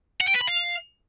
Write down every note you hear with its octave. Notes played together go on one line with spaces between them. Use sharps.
F#5
G5
B4
B5
F5